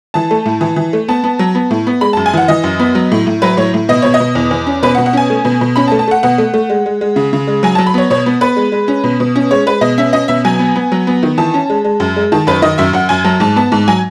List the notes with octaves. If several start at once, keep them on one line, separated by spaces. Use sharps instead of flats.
E3 A5
A3
A2
E3
E3
A3
B3 A5
B3
F#3
B3
A2
B3
G#3 B5
A5
F#2
G#5
E3 F#5
E3 D#5
F#2
B3
F#3
A2
A2
F#3 B4
A2 C#5
A2
B2 D#5
B2 C#5
D#5
B2
E2
E2
C#4
B2 B4
F#5
B2
F#5
C#4 G#5
A3
B2
B2
C#4 B5
A5
A3
A5
A3 F#5
B2 F#5
A3
A3
G#3
G#3
G#3
C#3
C#3
G#3
F#3 G#5
A5
F#3
B5
B3 C#5
B2 C#5
B3
B3 B4
G#3
G#3
C#4
B2
B2
C#4
G#3 C#5
G#3 B4
B2 D#5
C#4 E5
C#4 D#5
B2 E5
F#3 G#5
B3
B3
F#3
B3
D#3
E3 A5
C#4
G#3
G#3
F#2
G#3
D#3 A5
F#2 B4
D#3 D#5
F#2 E5
F#2 F#5
F#2 G#5
F#3 A5
G#2 A5
B3 A5
G#2 A5
F#3 G#5